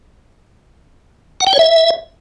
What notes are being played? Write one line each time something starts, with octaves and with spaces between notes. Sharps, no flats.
F#5
G5
C#5
E5